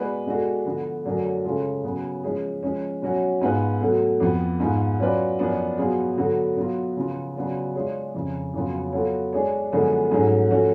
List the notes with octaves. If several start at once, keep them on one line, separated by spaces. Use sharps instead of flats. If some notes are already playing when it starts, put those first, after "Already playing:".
Already playing: G#3 B3 F#4 B4 D5
B2 G#3 D4 F#4 A4
D3 F3 B3
F#2 D3 F#3 A3 D4
C#3 G#3 C#4 F4 A4
C#3 F#3 B3
F3 G#3 C#4 G#4
F3 G#3 C#4
B2 F#3 C#4 F#4 C#5
G#2 G#3 B3 F4 B4
B2 F#3 A3
F2 F3 B3
G#2 G#3 B3 F4
F#3 C#4 F4 B4 D5
F#2 F3 B3 D4
B2 F#3 B3 F4 G#4
D3 F#3 B3 F#4 A4
B2 F#3 B3 F4
C#3 F3 B3 F4
C#3 F#3 B3 D4 F4
G#3 D4 F4 G#4 C#5
F2 C#3 F3
F2 C#3 F#3 B3 F4
F#3 B3 F4 A4 C#5
G#3 D4 G#4 C#5
F#2 D3 F3 G#3 B3
G#2 F#3 A3 C#4 G#4
F3 A3 C#4 F#4